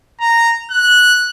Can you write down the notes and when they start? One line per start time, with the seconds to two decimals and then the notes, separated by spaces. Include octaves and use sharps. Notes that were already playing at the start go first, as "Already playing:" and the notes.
0.21 A#5
0.71 F#6